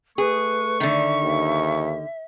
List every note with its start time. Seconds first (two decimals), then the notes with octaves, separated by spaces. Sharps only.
0.18 A3 G#4 B4 C#6
0.80 D3 D#3 E5
1.22 D#2